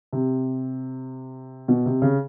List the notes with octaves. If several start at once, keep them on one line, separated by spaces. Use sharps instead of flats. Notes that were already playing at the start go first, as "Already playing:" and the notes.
C3
B2
C3
C#3